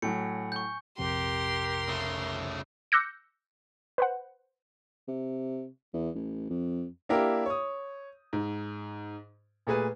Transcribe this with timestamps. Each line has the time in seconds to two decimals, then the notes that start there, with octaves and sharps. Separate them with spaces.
0.02 A2 F#3 G#5 C#7
0.52 C#6 G6
0.98 A#1 F2 C3 G4 A#4 C6
1.88 C#3 A3
2.92 D6 E6 F#6 G6 A#6 C#7
3.98 B4 C5 F#5
5.08 C3
5.94 E2
6.15 A1
6.50 F2
7.09 A#3 D4 E4 G4 A#4
7.46 C#5 D#6
8.33 G#2
9.67 A#2 A3 G#4 B4